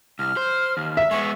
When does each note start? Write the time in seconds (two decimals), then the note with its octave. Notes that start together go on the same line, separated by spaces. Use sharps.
0.19 C2 F6
0.37 C5
0.77 D#2
0.97 E5
1.11 G#3 B3 C#6